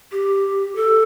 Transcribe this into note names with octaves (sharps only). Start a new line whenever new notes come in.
G4
A4